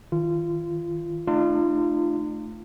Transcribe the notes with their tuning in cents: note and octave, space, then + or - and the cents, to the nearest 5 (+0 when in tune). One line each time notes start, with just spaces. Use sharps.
D#3 +25 F4 -25
A3 +0 D4 +45 F4 -25